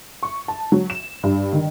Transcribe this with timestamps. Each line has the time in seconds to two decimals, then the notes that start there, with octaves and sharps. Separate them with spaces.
0.23 C#6
0.48 A5
0.72 F#3
0.90 E7
1.23 G2
1.53 D#3